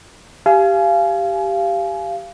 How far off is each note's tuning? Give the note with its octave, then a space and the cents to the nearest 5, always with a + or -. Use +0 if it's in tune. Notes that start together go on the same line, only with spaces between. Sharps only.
G4 +0 F5 -20 G#5 +25